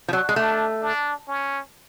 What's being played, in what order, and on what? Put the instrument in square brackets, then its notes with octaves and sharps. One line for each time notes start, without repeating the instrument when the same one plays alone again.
[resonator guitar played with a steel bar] F3
F#3
G#3
[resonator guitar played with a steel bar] A3 [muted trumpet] D4
[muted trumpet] D4
C#4